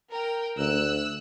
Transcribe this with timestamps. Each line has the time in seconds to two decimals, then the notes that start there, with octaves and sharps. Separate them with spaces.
0.11 A#4 G5
0.58 D2 E6 F#6